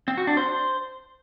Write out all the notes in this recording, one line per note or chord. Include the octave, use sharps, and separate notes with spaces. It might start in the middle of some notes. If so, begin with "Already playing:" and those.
C4
F#4
D4
C5